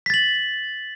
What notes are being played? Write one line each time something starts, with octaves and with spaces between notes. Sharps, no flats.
A6 B6 F#7